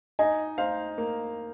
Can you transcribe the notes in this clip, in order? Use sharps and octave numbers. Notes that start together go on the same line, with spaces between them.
D#4 D#5 G#5
D#4 C5 F5
A#3